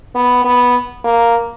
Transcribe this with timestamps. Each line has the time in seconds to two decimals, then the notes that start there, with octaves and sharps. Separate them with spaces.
0.15 B3
0.45 B3
1.04 A#3